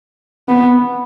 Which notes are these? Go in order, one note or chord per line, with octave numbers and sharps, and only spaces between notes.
B3